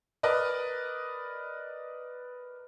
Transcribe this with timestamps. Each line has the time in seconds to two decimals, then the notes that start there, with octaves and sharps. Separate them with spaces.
0.23 A#4 B4 D5 D#5